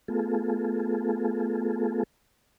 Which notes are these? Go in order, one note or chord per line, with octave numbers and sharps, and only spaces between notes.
A3 B3 F4 G#4 A4